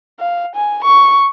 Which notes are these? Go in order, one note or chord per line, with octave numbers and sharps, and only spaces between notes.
F5
G#5
C#6